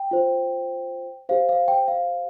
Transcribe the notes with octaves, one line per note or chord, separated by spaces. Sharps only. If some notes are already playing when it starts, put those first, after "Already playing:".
Already playing: G5
F4 C5
G4 C5 F5
F5
G5
F5